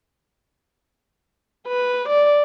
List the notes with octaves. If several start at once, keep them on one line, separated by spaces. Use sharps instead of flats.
B4
D5